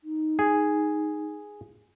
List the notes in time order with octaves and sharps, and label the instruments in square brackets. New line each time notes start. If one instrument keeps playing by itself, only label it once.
[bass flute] D#4
[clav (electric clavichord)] G#4